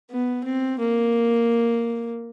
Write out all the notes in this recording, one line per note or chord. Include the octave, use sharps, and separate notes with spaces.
B3
C4
A#3